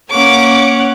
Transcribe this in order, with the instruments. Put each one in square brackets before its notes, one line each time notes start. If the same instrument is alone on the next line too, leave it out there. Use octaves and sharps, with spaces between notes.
[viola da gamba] A#3 [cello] C#4 [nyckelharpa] C#5 F#5 [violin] D6